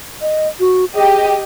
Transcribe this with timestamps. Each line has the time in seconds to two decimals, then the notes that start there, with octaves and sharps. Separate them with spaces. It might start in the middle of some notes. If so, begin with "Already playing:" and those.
0.21 D#5
0.60 F#4
0.95 G4 G#4 D#5